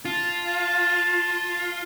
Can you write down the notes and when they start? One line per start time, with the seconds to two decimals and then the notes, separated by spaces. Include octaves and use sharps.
0.05 F4 A5